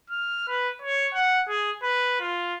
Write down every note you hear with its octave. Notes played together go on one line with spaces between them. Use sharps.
F6
B4
C#5
F#5
G#4
B4
F4